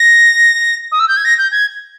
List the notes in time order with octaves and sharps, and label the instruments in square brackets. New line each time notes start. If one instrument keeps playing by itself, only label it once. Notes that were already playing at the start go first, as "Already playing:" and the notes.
Already playing: [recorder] A#6
D#6
E6
G6
G#6
A#6
G6
G#6